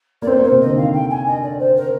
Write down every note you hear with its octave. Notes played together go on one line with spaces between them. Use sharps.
A#3 D5
C4 C5
A#3
C5
C3
D3 D#5
D#3 F5
G5
G#5
D#5
D5
C5
A#4